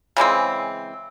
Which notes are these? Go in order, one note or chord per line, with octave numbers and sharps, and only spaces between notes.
C#3 E3 G#3 C4